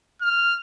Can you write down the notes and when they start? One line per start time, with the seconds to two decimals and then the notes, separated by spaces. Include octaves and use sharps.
0.22 F6